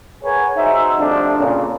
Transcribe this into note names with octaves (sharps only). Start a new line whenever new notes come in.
G#4 A#4 B4 C#5 F#5 G#5
D#4 F#4 G#4 C5 E5
F2 C3 F3 G3 A3 D4
F2 A#2 C#3